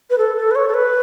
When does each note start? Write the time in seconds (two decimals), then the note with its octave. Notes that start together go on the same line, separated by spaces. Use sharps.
0.10 B4
0.18 A4
0.37 A4
0.51 B4
0.55 C#5
0.68 A4
0.74 B4